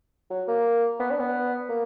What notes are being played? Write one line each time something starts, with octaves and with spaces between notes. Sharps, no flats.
F#3
A#3
B3
D4
B3
A#3